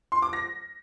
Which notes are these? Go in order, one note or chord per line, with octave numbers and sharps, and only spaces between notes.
C6
D6
A#6